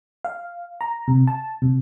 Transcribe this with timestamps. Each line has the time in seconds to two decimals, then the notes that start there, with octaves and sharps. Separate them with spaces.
0.25 F5
0.81 A#5
1.08 C3
1.27 A5
1.62 C3